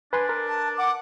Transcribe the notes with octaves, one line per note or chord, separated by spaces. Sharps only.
D4 B4 G#5 C6
A#4
A5
F#5 D6